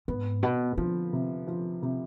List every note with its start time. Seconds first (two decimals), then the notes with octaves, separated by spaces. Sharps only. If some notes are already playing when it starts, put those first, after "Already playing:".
0.08 G#2 B3
0.43 B2 B3
0.77 D3 F3
1.13 C3
1.47 F3
1.82 C3